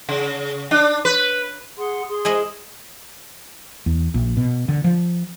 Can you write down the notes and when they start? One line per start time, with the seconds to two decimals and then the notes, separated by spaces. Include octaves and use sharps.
0.09 C#3
0.71 D4
1.05 B4
1.77 G#4 F#5 C6
2.08 G#4 C6
2.25 G#3 E4 D#5
3.86 E2
4.14 A#1
4.37 B2
4.69 D3
4.84 F3